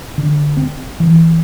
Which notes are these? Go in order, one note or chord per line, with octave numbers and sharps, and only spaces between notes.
D3
C4
E3